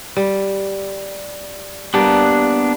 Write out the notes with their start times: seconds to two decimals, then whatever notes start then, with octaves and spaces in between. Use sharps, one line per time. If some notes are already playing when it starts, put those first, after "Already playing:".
0.17 G3
1.94 G3 A#3 B3 D4